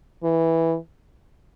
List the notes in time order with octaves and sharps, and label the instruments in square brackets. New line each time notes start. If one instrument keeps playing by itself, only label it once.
[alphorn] E3